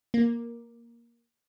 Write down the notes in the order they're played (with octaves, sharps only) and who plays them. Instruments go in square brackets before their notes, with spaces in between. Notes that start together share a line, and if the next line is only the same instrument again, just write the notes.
[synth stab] A#3